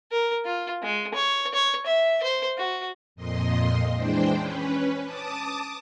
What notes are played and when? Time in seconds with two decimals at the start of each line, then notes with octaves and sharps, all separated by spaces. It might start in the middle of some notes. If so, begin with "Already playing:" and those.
0.12 A#4
0.45 F4
0.83 G#3
1.14 C#5
1.54 C#5
1.86 E5
2.23 C5
2.57 F#4
3.15 F2 A#2 D#5 C6
3.94 E3 G#3 D4 C5 G5
4.34 C#4 B4
5.03 A5 D6 D#6